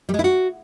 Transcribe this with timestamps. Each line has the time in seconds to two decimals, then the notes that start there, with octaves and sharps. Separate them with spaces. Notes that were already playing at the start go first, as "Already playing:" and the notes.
0.09 G3
0.14 G#3
0.19 E4
0.24 F#4